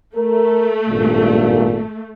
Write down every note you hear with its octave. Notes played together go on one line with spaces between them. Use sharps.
A3 A#4
G#1 G2 A#2